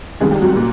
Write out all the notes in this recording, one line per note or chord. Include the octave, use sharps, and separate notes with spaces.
C2 C3 D#3 G#3 G#4
G3 G4
F#3 F#4
A#2